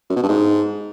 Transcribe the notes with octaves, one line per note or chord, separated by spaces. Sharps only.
F#2
B2
G2
G#2